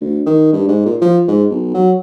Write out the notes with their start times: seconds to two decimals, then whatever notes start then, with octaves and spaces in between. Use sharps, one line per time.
0.01 D2
0.26 D#3
0.53 G2
0.68 G#2
0.85 A#2
1.01 F3
1.28 G#2
1.50 B1
1.74 F#3